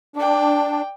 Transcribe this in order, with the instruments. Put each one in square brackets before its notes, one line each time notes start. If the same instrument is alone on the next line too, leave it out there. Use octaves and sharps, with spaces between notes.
[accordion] D4 [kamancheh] D5 G5